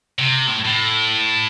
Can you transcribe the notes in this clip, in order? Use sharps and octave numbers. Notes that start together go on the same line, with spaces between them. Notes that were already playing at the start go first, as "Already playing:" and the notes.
C3
A2
A2